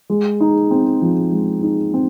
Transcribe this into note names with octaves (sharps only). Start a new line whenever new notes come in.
G#3
D#4
C4
F3
G#3
D#4
C4